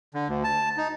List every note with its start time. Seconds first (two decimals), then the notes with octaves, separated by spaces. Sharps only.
0.14 D3
0.28 D2
0.44 A5
0.77 D#4